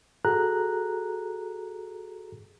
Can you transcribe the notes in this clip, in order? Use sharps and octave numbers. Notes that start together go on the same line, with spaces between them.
F#4 G#4 A4 A#5 F#6